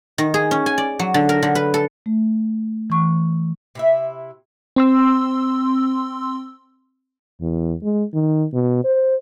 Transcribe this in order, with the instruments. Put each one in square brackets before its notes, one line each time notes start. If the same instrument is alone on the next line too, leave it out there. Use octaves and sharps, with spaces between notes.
[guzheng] D#3
G#4
C#4
G#5
D5
F#3
D3
A#4
D3
B4
A4
[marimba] A3
E3 C#6
[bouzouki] C3 E4 E5
[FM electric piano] C4 C6 E6
[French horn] E2
G#3
D#3
B2
C5